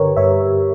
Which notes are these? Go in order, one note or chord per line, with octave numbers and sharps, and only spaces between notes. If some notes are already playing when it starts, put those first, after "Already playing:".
Already playing: G2 D3 G4 A#4 B4 C#5
G2 C#5 E5